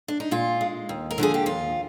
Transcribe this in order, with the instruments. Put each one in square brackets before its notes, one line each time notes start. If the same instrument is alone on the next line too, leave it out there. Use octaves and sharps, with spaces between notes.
[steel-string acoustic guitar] D4
D#4
A#2 F4
G#3
D#2
A#4
D3 F3 A#3 G#4
G4
D#2 F4